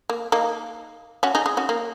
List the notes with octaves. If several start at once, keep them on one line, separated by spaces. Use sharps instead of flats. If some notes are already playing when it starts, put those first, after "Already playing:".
A#3
A#3 D#4
C#4 F#4
D#4 G#4
D#4 G#4
C#4 F#4
A#3